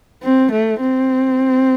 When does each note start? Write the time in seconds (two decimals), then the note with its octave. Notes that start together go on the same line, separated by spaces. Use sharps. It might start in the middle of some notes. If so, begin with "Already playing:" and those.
0.23 C4
0.51 A3
0.80 C4